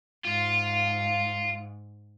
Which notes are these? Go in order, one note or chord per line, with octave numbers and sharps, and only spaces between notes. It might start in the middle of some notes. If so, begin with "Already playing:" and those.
G#2 F4